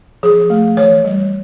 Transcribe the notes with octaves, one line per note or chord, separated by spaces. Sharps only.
F3 G#4
A3
E3 C#5
G3